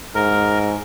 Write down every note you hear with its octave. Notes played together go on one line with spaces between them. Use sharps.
G#2 A#4